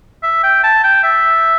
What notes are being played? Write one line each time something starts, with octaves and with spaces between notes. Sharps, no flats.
E5
G5
A5
G5
E5